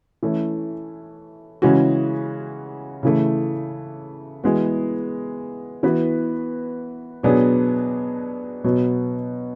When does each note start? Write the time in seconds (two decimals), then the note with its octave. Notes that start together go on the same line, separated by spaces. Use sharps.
0.23 E3 A3 C#4
1.62 C#3 E3 G#3 C#4 F#4
3.03 C#3 E3 A3
4.44 E3 G#3 B3 F#4
5.83 E3 B3 F#4 B4
7.23 B2 F#3 B3 D4 G#4
8.64 B2 F#3 B3